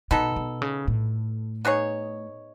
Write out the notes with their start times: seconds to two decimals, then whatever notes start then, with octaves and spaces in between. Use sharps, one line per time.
0.11 B2 B3 D#4 A4
0.36 B2
0.62 C#3
0.88 A2
1.65 B3 D#4 G#4 C#5